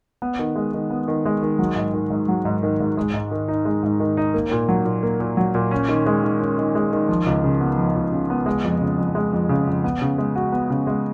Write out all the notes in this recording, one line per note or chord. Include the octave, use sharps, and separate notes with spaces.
B3
D#3
G#3
D#3
B3
D#3
G#3
D#3
F#3
G#2
D#3
G#2
F#3
G#2
D#3
G#2
G#3
G#2
D#3
D#4
G#3
G#2
D#3
D#4
A#3
A#2
F#3
A#2
A#3
A#2
F#3
A#2
C#4
D#3
G#3
D#3
C#4
D#3
G#3
D#3
F3
C#2
C#3
B3
F3
C#2
C#3
B3
G#3
F2
C#3
F2
G#3
F2
C#3
F2
B3
C#3
G#3
F#4
B3
C#3
G#3